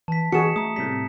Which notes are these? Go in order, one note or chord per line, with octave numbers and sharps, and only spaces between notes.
E3 A5 B6
E3 F#4 G#4 C#7 E7
A3 A#5 D#6
A2 C3 G3 B6